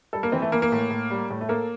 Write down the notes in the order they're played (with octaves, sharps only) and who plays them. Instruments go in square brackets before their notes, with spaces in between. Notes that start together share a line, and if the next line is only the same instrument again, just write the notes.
[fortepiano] G3 [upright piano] A4
[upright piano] A#3
[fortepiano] E3 [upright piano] C4
[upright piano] A3
[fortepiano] E3 [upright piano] A#3
[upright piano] A#3
[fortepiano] A2
A2
G3
A2
[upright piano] A3
[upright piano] A#3 [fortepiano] A4